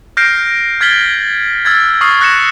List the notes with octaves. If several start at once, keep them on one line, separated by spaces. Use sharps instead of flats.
F6 G6 A#6 C7 D7
F6 G#6 A6 B6 F#7 G7
E6 F6 G#6 A6
C#6 D#6 F6 C7 F#7
F#6 A#6 C#7 E7